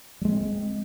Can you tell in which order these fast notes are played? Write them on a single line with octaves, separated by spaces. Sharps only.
G3 G#3 A#3 C4